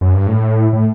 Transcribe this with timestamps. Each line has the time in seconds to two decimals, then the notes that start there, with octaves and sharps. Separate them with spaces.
0.01 F#2
0.14 G2
0.27 A2
0.73 A2